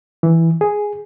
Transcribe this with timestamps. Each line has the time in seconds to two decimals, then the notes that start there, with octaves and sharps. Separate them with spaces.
0.23 E3
0.61 G#4